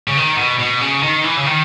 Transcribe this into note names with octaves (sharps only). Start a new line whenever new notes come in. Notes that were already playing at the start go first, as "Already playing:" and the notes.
C#3
D#3
B2
B2
C#3
D#3
E3
C#3
D#3